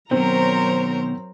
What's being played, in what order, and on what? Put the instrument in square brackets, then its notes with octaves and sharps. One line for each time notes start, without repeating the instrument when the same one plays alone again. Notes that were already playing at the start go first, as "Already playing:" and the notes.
[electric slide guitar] B2 D#3 [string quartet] F#3 A#4 [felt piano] C4 [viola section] C5 C#5 A#5